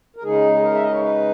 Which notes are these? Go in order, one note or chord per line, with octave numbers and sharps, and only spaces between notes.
A#4
C#3 G#3 D#4 G#4
G#4
A#4
E5
D#5
C#5
B4